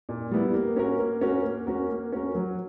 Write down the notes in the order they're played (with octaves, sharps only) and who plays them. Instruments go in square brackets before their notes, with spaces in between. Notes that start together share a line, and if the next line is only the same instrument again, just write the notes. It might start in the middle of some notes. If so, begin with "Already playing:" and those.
[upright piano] A#2
G3 B3 E4
A#3
C#4 F#4 A#4
A#3
C#4 F#4 A#4
A#3
C#4 F#4 A#4
A#3
C#4 F#4 A#4
F#3